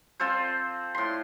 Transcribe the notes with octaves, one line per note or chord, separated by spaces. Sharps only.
C4 F4 A4 C5
A2 C6